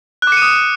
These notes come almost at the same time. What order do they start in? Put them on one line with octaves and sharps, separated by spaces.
F#6 D6 C#7 D#7 D#6